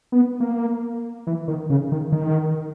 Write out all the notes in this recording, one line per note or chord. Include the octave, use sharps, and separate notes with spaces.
B3
A#3
E3
D#3
C#3
D#3
D#3